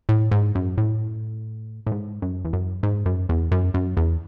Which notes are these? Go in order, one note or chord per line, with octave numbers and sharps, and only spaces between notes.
A2
G#2
F#2
A2
A2
G#2
F#2
E2
F#2
G#2
F#2
E2
F#2
F#2
E2